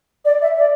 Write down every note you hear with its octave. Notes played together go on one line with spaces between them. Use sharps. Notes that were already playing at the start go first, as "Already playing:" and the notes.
D5
E5
D5